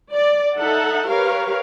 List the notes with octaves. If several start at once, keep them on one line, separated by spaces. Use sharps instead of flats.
D5
D#4 A4 E5 F#5
G4 A#4 B4 C#5 F5